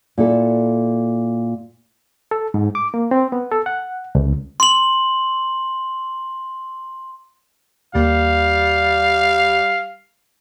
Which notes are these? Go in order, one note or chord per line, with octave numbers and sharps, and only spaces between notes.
A#2 E4 A4
A4
G#2
D6
A#3
C4
B3
A4
F#5
C#2
C6 F#7
D#2 G3 A#3 F5